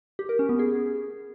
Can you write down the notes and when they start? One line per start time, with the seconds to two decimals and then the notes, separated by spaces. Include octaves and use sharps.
0.19 G4
0.29 A#4
0.39 C#4
0.49 B3
0.59 G#4